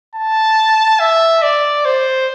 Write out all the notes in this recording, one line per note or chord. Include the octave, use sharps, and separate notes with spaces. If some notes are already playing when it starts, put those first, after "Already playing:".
A5
E5
D5
C5